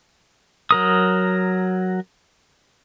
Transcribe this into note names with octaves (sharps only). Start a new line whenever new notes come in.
F#3 A#4 D#6